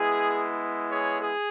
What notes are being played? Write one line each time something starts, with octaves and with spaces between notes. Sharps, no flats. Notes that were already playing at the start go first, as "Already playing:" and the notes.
Already playing: G#3 B3 E4 G#4
G#4 C#5
G#4